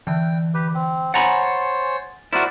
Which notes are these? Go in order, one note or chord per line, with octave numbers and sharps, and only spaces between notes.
D3 E3 G5
G4 B4
C4
C5 C#5 F#5 G#5 A#5 B5 A6
E4 F#4 A#4 C5 D5